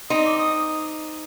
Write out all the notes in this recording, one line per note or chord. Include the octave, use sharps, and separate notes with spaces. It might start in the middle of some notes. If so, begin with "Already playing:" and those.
C4 D#4 D#6
D6
D#6